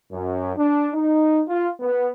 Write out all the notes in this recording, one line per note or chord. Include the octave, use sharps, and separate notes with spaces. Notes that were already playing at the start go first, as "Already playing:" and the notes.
F#2
D4
D#4
F4
B3